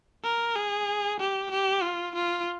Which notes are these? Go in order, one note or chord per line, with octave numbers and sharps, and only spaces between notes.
A#4
G#4
G4
G4
F4
F4